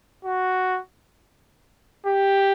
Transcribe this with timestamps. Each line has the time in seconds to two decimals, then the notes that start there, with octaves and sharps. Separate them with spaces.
0.25 F#4
2.06 G4